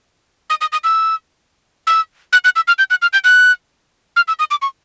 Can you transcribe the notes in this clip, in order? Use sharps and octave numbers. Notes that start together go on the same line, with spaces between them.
D#6
D#6
D#6
E6
E6
F#6
F#6
E6
F6
G6
F#6
F6
G6
F#6
F6
E6
D#6
D6
C#6